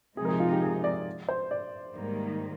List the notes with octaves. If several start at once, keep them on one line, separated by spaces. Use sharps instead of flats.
C3 F3 G#3 D#4 G#4
A#4
G#4
F4
G4
G#4
D5
C5
D5
G#2 D#3 G3 A#3